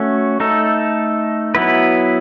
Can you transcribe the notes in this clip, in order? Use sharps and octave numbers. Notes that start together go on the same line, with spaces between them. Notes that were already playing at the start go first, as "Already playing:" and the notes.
Already playing: A3 C#4 F#4
A3 D#4 A4
F#3 B3 E4 B4